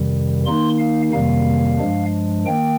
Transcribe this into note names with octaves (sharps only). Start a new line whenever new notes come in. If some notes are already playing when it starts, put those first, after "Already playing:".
Already playing: F2 C3 D#3 G3
D#3 A#3 D#4 C6
F5
F2 C3 D#3 G3 A#3 F5
G2 F3 G#3 D4
D#3 A#3 G5